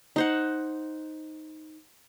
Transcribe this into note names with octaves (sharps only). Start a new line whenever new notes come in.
D#4 C5 F#5